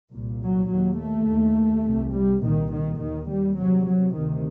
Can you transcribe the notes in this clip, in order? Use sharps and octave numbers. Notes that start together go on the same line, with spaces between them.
C2 A#2
F#3
D#2 F#3
A3
D#2
C2 C3
G3
C2 A#2 D#3
D#3
D#2 D#3
G3
C2 C3 F#3
F#3
D2 C3 D#3